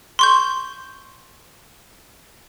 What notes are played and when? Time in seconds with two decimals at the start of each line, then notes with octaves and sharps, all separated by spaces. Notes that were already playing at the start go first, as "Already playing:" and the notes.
0.19 C6 C#6 G6